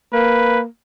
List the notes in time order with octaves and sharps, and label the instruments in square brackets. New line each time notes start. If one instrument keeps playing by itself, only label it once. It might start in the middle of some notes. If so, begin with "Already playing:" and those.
[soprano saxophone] A#3 [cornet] B4